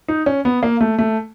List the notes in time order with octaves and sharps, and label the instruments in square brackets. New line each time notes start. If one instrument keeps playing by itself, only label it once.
[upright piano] D#4
C#4
B3
A#3
A3
A3